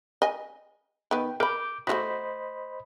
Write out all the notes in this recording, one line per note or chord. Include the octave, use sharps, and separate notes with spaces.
D#5 G#5
D#3 B3 G5
A#4 B5 D6 G6
A3 F4 F#4 C5 D#5 B5